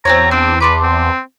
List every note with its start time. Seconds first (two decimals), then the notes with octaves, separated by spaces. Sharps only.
0.05 E2 C4 F#4 C#5 A#5
0.31 C4 D4
0.60 B4 A5 C6 D6
0.82 C4